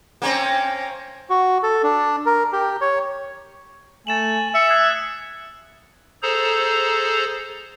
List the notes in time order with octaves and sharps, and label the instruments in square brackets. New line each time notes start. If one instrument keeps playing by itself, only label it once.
[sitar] A#3 C4 C#4
[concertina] F#4
A4
D4
A#4
G4
C#5
[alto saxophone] A3 [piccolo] G#5 [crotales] A6 E7 F#7
[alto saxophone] E5 [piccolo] C#7
[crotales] D#6 F#6 C7 [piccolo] G#6
[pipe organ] G#4 A4 C5 A#5